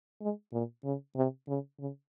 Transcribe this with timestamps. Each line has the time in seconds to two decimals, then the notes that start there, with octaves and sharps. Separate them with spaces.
0.21 G#3
0.53 A#2
0.85 C#3
1.16 C3
1.48 C#3
1.80 C#3